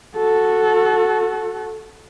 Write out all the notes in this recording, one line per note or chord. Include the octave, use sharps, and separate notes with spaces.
F#4 A4